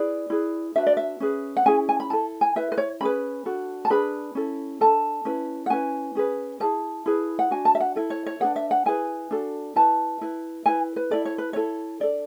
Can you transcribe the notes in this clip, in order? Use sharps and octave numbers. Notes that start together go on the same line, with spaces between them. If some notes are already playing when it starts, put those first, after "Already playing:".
Already playing: E4 G#4 B4 D5
E4 G#4 B4
D4 F#4 B4 E5
D5
E5
C#4 G#4 B4
F#5
C#4 E4 G#4 G#5
G#5
B5
E4 A4 A5
G#5
E4 B4 E5
B4
C#5
C#4 G#4 B4 B5
D4 F#4 A4
A5
D4 G#4 B4 B5
C#4 E4 A4
D4 A4 A5
C#4 E4 B4
F#5
C#4 E4 B4 G#5
C#4 G#4 B4
E4 G#4 B4 A5
E4 G#4 B4
F#5
D4 F#4 G#5
A5
E5
F#5
E4 A4
C#5
C#5
D4 G#4 B4 F#5
E5
F#5
E4 G#4 B4 G#5
D4 F#4 A4
E4 B4 A5
E4 B4
E4 B4 G#5
B4
E4 A4 D5
C#5
B4
E4 A4 C#5
D4 A4 D5